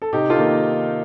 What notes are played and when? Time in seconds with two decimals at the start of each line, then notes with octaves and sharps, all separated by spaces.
0.02 A4
0.13 C3 D#4 G4
0.29 F4 A4
0.38 D#3 A#3